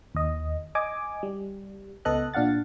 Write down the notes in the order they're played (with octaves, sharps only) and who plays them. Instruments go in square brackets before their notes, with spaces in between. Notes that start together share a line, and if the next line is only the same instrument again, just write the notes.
[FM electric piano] D#2 D#5
D#5 G#5 D6
G3
C#2 B3 A4 D#5 F#6
A#2 D4 F5 F#5 A6